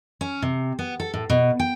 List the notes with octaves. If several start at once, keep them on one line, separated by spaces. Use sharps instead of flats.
C#4
C3
B3
A4
A2
B2
G5